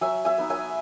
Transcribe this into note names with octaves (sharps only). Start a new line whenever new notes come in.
F#3 E5 G#5
E5 G#5
B3 D#4
E5 G#5